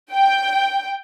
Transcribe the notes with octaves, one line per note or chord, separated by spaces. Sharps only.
G5